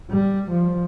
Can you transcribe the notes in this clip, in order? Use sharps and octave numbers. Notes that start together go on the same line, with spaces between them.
G3
F3